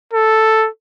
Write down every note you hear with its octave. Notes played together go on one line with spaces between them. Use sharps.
A4